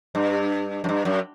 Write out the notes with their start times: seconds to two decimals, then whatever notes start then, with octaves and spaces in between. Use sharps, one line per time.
0.15 G2
0.84 F#2
0.89 G2
1.05 F#2